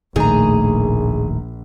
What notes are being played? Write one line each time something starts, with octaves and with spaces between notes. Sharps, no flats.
D#1 A#1 A2 D#3 A3 G#4 A#5